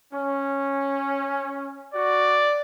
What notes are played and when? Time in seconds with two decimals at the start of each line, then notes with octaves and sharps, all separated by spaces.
0.13 C#4
1.94 F#4 D5